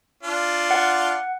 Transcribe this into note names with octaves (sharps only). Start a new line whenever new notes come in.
D4 F4
F#5